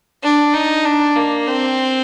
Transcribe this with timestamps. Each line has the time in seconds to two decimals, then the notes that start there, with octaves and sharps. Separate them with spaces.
0.23 D4
0.54 D#4
0.85 D4
1.16 A#3
1.48 C4